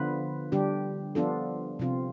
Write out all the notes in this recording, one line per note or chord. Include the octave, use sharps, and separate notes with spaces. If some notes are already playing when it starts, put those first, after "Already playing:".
Already playing: D3 F3 B3 F4 B4
D3 G3 D4 G4
F3 B3 D4 F4 A4
C3 F3 C4 F4